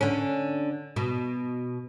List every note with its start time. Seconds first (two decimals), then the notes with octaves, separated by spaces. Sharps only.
0.01 D3 C#4
0.96 B2